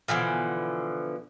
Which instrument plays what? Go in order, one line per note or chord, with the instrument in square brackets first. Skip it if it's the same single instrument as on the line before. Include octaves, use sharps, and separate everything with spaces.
[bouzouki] B2 D3 E3 F3